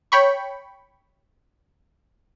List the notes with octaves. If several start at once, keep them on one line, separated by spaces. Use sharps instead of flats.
C#5 G5 B5 C#6